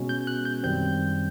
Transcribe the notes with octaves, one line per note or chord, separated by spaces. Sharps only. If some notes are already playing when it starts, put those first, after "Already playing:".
Already playing: B2 G#3 C#4
G6
F#6
G6
F#2 D#3 G3 C4 G6